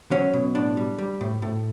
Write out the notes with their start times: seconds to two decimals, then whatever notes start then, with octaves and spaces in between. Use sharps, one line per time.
0.11 F#3 C#4
0.33 B2
0.55 A2 D4
0.77 G3
0.98 G3
1.21 A2
1.42 A2